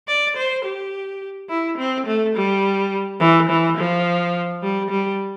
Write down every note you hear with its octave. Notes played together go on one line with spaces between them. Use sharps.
D5
C5
G4
E4
C4
A3
G3
E3
E3
F3
G3
G3